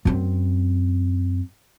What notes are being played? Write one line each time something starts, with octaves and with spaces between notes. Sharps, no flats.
F#2 C4